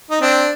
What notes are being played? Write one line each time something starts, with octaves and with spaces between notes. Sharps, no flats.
D#4
C4 D4